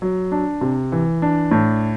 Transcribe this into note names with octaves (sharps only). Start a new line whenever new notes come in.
F#3
D4
C3
E3
D4
A2